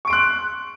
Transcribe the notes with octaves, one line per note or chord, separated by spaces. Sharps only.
C6 C#6 F#6 D7